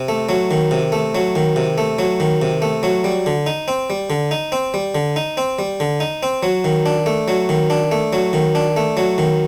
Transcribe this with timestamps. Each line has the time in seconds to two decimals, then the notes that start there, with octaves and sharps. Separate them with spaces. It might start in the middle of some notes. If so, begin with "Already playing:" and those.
Already playing: C3
0.08 A3
0.29 F#3
0.51 D#3
0.71 C3
0.92 A3
1.15 F#3
1.36 D#3
1.56 C3
1.78 A3
1.99 F#3
2.20 D#3
2.42 C3
2.62 A3
2.83 F#3
3.04 G3
3.26 D3
3.46 D#4
3.68 C4
3.90 G3
4.10 D3
4.31 D#4
4.52 C4
4.74 G3
4.95 D3
5.16 D#4
5.37 C4
5.59 G3
5.80 D3
6.00 D#4
6.23 C4
6.43 F#3
6.64 D#3
6.86 D4
7.06 A3
7.28 F#3
7.49 D#3
7.70 D4
7.91 A3
8.13 F#3
8.33 D#3
8.55 D4
8.77 A3
8.97 F#3
9.18 D#3